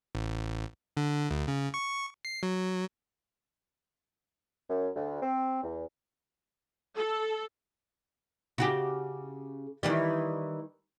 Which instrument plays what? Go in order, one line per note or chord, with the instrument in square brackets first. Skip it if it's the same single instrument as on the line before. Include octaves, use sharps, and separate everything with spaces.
[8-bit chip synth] A1
D3
D2
C#3
C#6
C7
F#3
[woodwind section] F#2
D2
C4
E2
[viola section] A4
[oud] C#3 F#4 G4
D#3 E3 G3